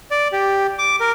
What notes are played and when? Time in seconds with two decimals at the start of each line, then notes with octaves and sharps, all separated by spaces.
0.11 D5
0.33 G4
0.79 D6
1.00 A#4